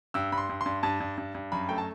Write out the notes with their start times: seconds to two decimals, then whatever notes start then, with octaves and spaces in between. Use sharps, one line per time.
0.14 G2 E6
0.32 G2 B5
0.38 C6
0.49 G2
0.61 C6
0.66 G2
0.83 G2 A5
1.00 G2
1.18 G2
1.35 G2
1.52 F#2 B5
1.69 A3 G5
1.78 A5